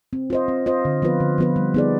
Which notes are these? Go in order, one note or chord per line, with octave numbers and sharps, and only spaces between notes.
C4
F4 C5 D#5
C4
F4 C5 D#5
D3
F3 B3 F4 B4
D3
F3 B3 F4 B4
G3
B3 D#4 G#4 D5